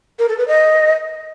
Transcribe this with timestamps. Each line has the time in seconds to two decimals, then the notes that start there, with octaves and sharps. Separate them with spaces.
0.19 A#4
0.28 A4
0.38 B4
0.48 D#5